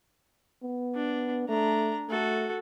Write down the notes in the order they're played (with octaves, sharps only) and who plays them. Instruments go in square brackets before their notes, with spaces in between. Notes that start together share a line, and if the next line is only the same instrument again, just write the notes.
[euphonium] B3
[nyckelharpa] D4
[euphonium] A3 [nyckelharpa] D4 A#5
[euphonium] A3 [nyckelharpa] F#4 A4